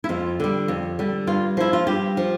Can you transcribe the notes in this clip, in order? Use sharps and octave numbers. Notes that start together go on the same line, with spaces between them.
E4
F2 F4
D3 G3
F2
D3 G3
G2 F4
F3 E4
F4
G2 G4
F3